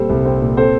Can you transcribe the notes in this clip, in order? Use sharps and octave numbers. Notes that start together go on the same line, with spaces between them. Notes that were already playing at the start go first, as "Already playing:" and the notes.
Already playing: A#2 G3 C4 A4 C5
C2
C4
A#2
C4 A4 C5